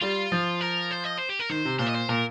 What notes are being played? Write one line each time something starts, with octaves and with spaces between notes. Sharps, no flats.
G3 F4
F3
A#4
C5
D#5
C5
G4
A#4
D#3 C5
C3
A#2 C5
D#5
C5
A#2 A#4